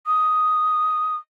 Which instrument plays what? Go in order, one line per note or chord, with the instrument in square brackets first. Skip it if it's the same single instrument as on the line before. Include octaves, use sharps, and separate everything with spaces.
[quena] D#6